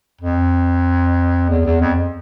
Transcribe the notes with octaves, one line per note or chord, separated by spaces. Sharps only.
F2
E2
E2
F2